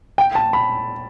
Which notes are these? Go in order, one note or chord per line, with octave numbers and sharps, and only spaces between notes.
G5
A5
B5